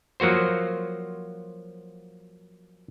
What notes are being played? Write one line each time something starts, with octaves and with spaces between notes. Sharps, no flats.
F3 F#3 A#3 F#4 C5